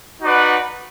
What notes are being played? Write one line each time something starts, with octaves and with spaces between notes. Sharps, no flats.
D#4 F#4 B4 D5 F#5